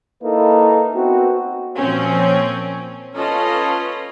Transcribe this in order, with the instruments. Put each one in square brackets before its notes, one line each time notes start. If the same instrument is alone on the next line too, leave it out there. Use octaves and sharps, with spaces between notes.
[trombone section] A#3 D#4 E4 A4 B4
B3 C4 F#4
[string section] A#2 F3 C4 C#4
C#4 F4 A4 B4 D#5